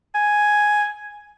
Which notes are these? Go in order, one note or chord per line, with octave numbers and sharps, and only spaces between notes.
G#5